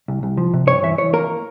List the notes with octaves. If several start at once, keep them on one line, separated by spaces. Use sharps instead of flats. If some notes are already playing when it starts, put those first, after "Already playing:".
C2
C2
F3
C3
G2 C#5
E3 E5
E3 C#5
A#3 A#4